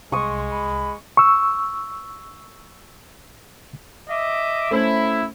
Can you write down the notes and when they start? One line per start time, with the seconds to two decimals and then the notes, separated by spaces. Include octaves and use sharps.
0.12 C2 G#3 C6 C#6 D#6
0.51 B5
1.17 C#6 E6
4.09 D#5 E5 D6
4.71 A3 C#4 E4 C5